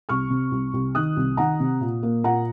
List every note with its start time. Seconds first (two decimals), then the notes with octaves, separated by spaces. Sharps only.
0.09 C2 C#6 F6
0.30 C3
0.52 C2
0.74 C2
0.95 D#3 D#6 F#6
1.17 C2
1.37 D#3 F#5 A#5
1.60 C3
1.81 A#2
2.03 A#3
2.24 A#2 F#5 A#5